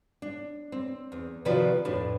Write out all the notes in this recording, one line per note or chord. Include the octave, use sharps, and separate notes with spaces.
D4
C4
E2
C3 D#3 F3 F#4 B4 D5
F2 A2 D4 B4